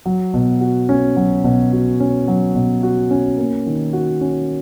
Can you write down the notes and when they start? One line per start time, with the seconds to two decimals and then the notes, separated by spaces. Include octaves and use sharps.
0.06 F#3
0.34 B2
0.61 F#4
0.89 C#4
1.16 F#3
1.44 B2
1.72 F#4
2.00 C#4
2.28 F#3
2.55 B2
2.83 F#4
3.11 C#4
3.38 A#3
3.66 D#3
3.93 F#4
4.21 C#4